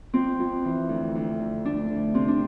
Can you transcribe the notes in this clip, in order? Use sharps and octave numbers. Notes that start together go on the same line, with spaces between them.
F2 C4
F2
E3
D2
D2
D3
A3 D4
D2
C3 C4
D4